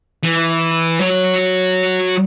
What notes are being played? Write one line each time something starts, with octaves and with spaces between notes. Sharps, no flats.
E3
F#3